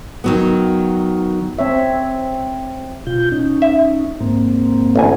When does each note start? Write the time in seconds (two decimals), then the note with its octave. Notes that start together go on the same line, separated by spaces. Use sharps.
0.24 D#3 F#3 B3
1.59 C4 C#5 E5
3.06 B2 F4 G6
3.32 C#4 D#4
3.62 E5
4.20 G#2 A#3 C4
4.96 A1 D2 G#5